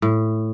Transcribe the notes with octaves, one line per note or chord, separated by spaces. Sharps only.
A2